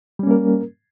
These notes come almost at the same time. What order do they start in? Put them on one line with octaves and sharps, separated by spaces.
G3 C#4 A#3 A#4